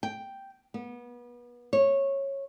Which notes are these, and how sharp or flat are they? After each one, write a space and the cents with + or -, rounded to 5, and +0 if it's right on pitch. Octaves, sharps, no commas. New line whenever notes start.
G5 +0
B3 -30
C#5 -15